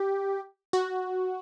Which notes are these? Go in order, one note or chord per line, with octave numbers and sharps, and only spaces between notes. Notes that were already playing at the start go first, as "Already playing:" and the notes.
Already playing: G4
F#4